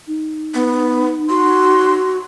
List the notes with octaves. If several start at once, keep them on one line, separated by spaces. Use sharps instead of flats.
D#4
B3
F#4 C6